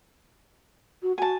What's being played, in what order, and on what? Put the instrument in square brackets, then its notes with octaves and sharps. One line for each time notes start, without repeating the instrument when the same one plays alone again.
[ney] F#4
[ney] F#4 [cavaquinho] G#5 A5